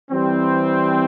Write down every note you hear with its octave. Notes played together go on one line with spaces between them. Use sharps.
E3 G3 C4